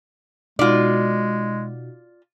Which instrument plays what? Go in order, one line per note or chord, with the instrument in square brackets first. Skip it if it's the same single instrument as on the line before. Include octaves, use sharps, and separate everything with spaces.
[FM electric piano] B2 D#4 F#4 [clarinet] G#3 [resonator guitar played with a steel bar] F4 D5